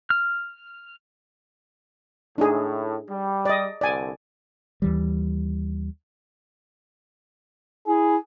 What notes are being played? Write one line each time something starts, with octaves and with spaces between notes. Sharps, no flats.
F6
A2 D4 D#4 G#4
G3
D5 D#5
C2 D3 D5 G#5
D#2 E3 G3
E4 G#4